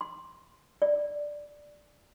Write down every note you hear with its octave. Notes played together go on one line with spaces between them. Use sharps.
C6
D5